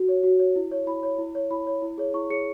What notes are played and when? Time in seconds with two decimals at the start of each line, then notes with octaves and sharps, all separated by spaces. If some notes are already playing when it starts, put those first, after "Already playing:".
Already playing: F#4
0.09 C#5
0.23 F#4
0.40 C#5
0.56 E4
0.71 C#5
0.87 E4 B5
1.03 C#5
1.18 E4
1.35 C#5
1.51 E4 B5
1.67 C#5
1.82 E4
1.98 G#4 C#5
2.14 E4 C#6
2.30 G#4 C#5 C#7